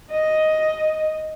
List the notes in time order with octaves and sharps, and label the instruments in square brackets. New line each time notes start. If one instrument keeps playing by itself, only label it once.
[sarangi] D#5